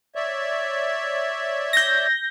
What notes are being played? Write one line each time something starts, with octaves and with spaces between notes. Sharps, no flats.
C#5 D5 E5
G6 A#6